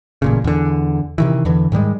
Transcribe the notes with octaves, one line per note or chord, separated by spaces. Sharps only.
A1 A#2 C#3
E2 D3
C3 D#3 E3
E2 D3 E3
G#2 D#3 G3 G#3